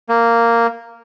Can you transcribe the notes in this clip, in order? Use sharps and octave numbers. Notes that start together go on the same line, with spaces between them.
A#3